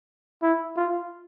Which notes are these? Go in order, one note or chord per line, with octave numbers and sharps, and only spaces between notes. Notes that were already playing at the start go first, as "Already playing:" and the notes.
E4
F4